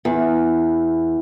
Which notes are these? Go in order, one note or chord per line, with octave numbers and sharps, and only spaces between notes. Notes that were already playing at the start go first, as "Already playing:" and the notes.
E2